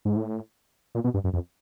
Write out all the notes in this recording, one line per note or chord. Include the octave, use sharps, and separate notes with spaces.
G#2
A2
A#2
B2
G2
F#2
F2